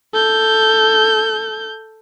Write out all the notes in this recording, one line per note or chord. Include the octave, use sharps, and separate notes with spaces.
A4 G6